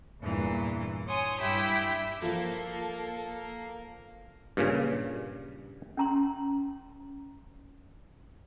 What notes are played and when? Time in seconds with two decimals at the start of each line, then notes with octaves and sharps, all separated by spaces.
0.21 E2 G2 A#2 E3
1.07 C#5 G#5 C6 D#6
1.40 G2 E4 G4 E5 G5
2.22 F3 A#3 F4 A4
4.57 G2 A#2 C#3
5.97 C#4 A#5 C6